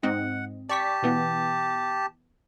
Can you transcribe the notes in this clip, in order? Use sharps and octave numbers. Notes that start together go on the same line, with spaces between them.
G#2 C4 D#5 F#5
G4 D5 A5 C#6 B6
B2 E3 B3